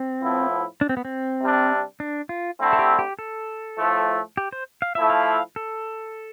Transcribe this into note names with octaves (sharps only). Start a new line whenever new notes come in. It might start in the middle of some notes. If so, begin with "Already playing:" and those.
Already playing: C4
A2 F3 B3 E4
D4
C4
B3
C4
C3 G3 D4
D4
F4
D3 A3 C4 E4
A4
G4
G4
A4
A2 F3 A3
G4
C5
F5
F3 A3 E4 E5
F5
A4